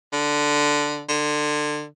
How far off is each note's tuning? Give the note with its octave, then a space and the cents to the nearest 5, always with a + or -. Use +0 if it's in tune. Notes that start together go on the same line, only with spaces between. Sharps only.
D3 +0
D3 +25